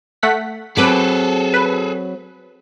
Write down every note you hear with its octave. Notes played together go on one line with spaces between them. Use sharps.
A3 F#5 B6
F#3 C4 G#4 A4 B4 D6 B6
B4